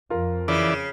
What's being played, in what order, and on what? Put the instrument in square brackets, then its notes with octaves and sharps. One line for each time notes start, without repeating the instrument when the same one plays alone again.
[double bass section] F2 [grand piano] F4 A#4
[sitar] C#3 [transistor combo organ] E3 D5